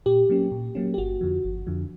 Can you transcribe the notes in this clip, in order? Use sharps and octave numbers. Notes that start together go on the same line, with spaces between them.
A#2 G4
F#3 A#3 C#4
A#2
F#3 A#3 C#4
G4
G1 F#4
F2 D3 F3
G1
F2 D3 F3